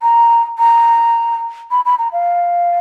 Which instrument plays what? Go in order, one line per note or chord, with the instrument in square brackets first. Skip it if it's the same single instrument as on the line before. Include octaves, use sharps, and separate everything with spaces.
[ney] A#5
A#5
B5
B5
A#5
F5